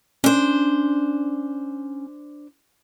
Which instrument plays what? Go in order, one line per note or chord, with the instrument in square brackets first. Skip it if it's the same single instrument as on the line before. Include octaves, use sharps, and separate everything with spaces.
[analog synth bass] C#4 [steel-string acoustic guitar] D4 C5